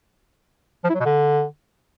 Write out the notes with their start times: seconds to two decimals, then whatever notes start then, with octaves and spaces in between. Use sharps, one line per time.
0.84 F3
0.89 E4
0.95 F#3
1.00 B2
1.05 D3